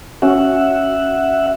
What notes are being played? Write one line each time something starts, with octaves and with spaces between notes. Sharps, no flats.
C#4 F#4 E5 F#5